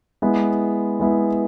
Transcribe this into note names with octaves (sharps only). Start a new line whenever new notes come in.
G#3 B3 E4
G#3 B3 E4